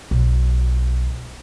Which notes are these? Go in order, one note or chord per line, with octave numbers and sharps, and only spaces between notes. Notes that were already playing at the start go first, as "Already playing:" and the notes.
B1